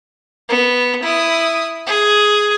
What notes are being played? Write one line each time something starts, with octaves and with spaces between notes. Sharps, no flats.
B3
E4 D#6
G#4